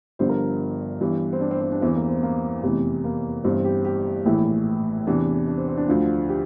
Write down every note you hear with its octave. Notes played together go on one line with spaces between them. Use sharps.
G1 G2 D3 F3 C5
A#4
G1 G2 E3
C4
D4
C4
C4
D4
E2 E3 C4
A#3
C4
A#3
F1 E2 C3 E3
A#3
G1 G2 E3 C4
C4
G4
G4
A#1 A2 E3 E4
E2 C3 E3 D4
D4
C4
C4
D4
D2 D3 F3 F4
G4